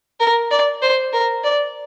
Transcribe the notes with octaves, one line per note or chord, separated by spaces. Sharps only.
A#4
D5
C5
A#4
D5